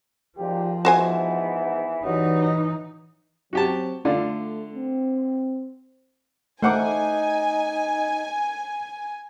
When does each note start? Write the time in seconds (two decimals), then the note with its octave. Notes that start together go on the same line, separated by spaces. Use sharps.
0.38 G#1 A#2 F3 G4
0.85 G#2 E3 B3 F#4 C5 G#5
2.04 G2 E3 F#3 D#4
3.53 F#3 C4 F#4 G4 A5
4.05 D3 A3 F4 D5
4.75 C4
6.62 A3 D#4 A4 A#4 C5 F#5 G#5 D6